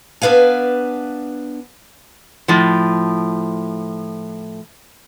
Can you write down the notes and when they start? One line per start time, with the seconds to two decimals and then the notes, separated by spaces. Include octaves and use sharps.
0.22 B3 D4 B4 F5 G#5
2.48 A2 F3